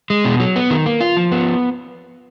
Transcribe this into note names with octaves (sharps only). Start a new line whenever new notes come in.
G#3
B2
F#3
B3
D#3
A#3
F4
F3
B3